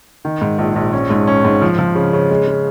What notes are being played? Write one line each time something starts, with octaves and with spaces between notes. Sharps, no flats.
D#3
G#2
A#1
A#1
C#4
G#2
C#4
G#2
F3
F3
C#3
C#3
G#3
G#3